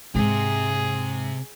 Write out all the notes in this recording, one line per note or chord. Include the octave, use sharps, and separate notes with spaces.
G#2 C3 G#3 G#4